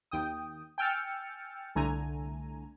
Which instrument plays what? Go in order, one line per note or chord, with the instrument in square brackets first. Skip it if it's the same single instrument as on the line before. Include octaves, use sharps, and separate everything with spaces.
[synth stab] D#2 G5 D#6
G5 G#5 E6 F6 A6 C#7
C2 D3 A3 G#5 A#5